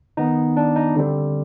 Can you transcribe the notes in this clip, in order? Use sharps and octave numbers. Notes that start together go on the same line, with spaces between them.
D#3 B3 D#4
D4
D#4
D3 G3 C4